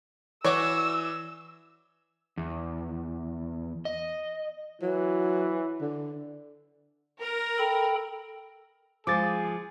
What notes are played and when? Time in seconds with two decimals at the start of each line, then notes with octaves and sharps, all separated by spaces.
0.45 E3 F#4 C#5 D5 D6 E6
2.37 E2
3.85 D#5
4.82 E3 F#3
5.81 D3
7.20 A#4
7.58 A4 G5 B5
9.07 F3 G#3 G#4 D6 A6